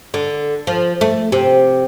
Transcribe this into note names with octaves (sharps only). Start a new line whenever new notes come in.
D3
F3
A3
C3